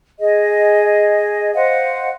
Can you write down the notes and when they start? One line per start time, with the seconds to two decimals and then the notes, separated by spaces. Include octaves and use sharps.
0.19 G#4 D#5
1.53 C5 D#5 F5 F#5